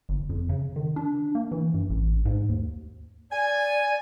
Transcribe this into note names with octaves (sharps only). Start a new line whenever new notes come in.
G1
F2
C#3
D#3
D4
A#3
E3
G2
A1
G#2
D#2
D5 G#5